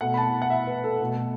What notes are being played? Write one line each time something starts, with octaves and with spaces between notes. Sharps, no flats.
B2 A3 F#5
B5
A5
F#5
E5
B4
A4
B2 A3